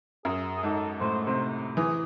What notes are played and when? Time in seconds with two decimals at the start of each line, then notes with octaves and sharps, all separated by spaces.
0.25 F#2 G#4
0.57 G#4
0.63 G#2 A4
1.01 A2 C5
1.26 C3 C5
1.77 E3 G#4